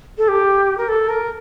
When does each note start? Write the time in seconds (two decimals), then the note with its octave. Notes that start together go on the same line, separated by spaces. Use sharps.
0.18 A4
0.28 G4
0.78 A#4
0.88 A4
1.09 A#4